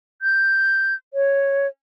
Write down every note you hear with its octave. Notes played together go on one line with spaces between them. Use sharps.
G6
C#5